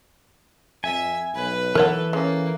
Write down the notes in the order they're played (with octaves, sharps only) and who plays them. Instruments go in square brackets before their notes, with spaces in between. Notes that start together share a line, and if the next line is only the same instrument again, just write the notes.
[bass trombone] F2 [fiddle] E5 [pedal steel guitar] G#5
[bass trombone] B1 [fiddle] B4
[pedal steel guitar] E3 A4 [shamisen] A#4 C#5 F#5
[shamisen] G#3 [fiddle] A#3 [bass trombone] C#4